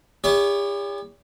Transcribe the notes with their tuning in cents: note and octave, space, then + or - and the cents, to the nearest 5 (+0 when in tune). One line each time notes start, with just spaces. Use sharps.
E4 +0 G4 +45 C#5 +45